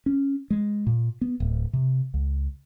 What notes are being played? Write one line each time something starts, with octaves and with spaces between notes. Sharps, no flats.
C#4
G#3
A#2
B3
D1
C3
C#2